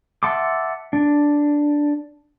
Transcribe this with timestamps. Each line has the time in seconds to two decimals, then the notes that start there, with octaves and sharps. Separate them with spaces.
0.23 E5 F#5 A5 C6 D6
0.93 D4